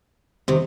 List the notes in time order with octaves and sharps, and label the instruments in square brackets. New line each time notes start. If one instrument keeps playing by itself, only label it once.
[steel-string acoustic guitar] C3 D#3